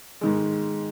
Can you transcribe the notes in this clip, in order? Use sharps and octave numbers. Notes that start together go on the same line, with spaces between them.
G#2 D#3 G#3